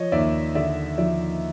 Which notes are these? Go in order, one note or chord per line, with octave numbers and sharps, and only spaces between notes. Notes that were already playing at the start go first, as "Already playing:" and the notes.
Already playing: F3 C#5 D#5
D#2 D5 E5
D3 D5 E5
F3 D5 E5